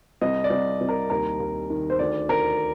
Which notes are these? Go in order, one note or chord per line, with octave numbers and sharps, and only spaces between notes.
C2 D#5
D5
C2
C2
A#4
D#2 A#4
D#2
D#3
C5
D2 D5
D2 A#4